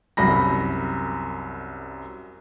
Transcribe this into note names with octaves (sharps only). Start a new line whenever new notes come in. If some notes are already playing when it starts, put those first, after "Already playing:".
C2 F#2 B5 A#6